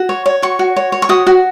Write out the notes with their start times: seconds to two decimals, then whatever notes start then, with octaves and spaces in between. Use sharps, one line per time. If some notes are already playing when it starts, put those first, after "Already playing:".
Already playing: F#4
0.09 C#5
0.26 C#5
0.42 F#4 C#6
0.59 F#4
0.76 C#5
0.92 C#5
1.02 C#6
1.09 F#4 D#6
1.27 F#4